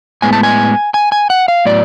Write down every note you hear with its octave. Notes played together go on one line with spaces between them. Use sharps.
A2 G#3 B3 G#5
A5
G#5
G#5
G#5
F#5
F5
A2 F#3 B3 D5